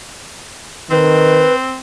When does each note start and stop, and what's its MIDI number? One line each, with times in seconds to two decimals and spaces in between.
0.90 1.46 51
0.90 1.80 60
0.90 1.54 71